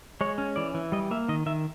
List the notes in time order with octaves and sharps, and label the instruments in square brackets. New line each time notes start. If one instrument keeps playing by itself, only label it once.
[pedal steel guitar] G#3 C#5
C#4
E3 D5
E3
G3 D#5
A#3 E5
D#3 D#5
D#3 E5